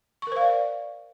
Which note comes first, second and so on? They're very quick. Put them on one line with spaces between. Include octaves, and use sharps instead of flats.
C#6 A#4 C5 F5 D5